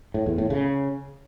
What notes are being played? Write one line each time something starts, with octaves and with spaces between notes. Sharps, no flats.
A2
E2
A2
C#3